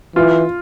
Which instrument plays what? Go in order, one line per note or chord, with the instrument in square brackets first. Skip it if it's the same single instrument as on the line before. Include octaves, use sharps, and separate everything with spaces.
[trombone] E3 [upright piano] F4